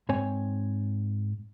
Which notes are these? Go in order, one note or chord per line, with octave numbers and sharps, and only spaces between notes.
G#2 C4 C#5 G#5